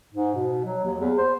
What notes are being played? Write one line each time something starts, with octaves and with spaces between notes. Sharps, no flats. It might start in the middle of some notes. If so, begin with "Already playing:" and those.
G#2
B2
F#3
D#2
E2
C5